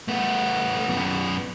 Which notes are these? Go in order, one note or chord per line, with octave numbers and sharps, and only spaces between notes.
A3 B3
F#2 B3